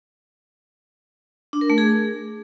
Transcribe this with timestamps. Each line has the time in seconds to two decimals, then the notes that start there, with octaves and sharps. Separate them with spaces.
1.53 D4
1.61 A#4
1.70 A3
1.78 G#4